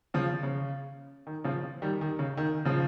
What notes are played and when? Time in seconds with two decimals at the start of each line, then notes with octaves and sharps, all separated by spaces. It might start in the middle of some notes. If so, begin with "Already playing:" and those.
0.14 C#3 F3
0.43 C#3
1.27 D#3
1.44 C#3 F3
1.82 D#3 G3
2.01 D#3
2.19 C#3
2.37 D#3
2.65 C#3 F3